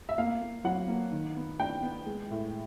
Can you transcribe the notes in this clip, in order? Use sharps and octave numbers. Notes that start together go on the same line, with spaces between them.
E5
A#3 F5
A#3
F#3 F#5
A#3
D#3
B3
D4 G5
B3
G#3
A2